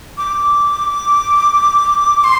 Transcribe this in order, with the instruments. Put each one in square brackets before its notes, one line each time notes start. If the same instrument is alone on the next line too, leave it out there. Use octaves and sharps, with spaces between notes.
[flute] D6
C6